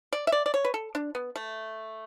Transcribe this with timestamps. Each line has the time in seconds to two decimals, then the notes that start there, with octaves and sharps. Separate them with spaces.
0.12 D5
0.27 E5
0.32 D5
0.46 D5
0.54 C#5
0.64 B4
0.74 A4
0.95 D4
1.15 B3
1.36 A3